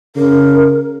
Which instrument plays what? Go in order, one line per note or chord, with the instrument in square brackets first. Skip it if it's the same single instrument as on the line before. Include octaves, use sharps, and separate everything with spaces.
[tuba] C#3 [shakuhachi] A#4